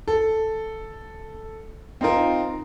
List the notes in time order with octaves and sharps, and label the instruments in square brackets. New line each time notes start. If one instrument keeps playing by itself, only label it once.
[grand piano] A4
C4 D#4 F4 A#4